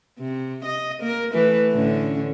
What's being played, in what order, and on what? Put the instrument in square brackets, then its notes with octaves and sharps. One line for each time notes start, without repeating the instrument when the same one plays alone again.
[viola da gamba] C3
D#5
A#3 A#4
E3 A3 B4
A2 D3 C#4